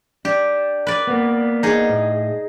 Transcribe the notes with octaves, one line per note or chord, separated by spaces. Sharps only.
D4 G4
B4 D5
A#3 B3
D#4 G#4
A2